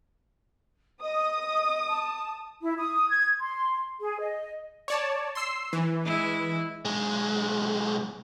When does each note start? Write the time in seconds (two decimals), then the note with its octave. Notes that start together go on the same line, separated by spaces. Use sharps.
1.02 D#5 D#6
1.88 A5
2.62 E4
2.78 D#6
3.09 G#6
3.40 C6
4.00 G#4
4.19 D#5
4.88 C#5 D5 A5
5.35 C6 E6 C7
5.73 E3
6.04 G#3 E4
6.85 B1 G#3